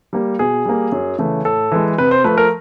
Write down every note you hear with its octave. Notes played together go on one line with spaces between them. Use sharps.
G3 A#3
B2 G#4
G3 A#3
F#2
C#3 E3 A3
A2 A4
E3 G#3
C3 B4
C5
F3 A3 B4
A#4